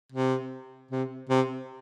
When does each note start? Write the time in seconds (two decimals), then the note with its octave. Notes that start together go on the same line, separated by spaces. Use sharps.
0.12 C3
0.91 C3
1.29 C3